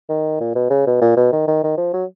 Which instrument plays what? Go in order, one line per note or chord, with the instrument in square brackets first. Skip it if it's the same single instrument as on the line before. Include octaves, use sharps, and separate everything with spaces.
[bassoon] D#3
A#2
B2
C#3
B2
A#2
B2
D#3
D#3
D#3
F3
F#3